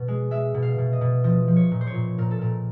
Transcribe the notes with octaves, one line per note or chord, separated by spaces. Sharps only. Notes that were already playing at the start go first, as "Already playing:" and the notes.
Already playing: B2 B4
G#3
G#3 E5
B2
F5
B2
D#5
B2
F3 D#5
F3
C#5
A#2
C5
C#5
A#2
A#2 A#4
A4
A#2 A#4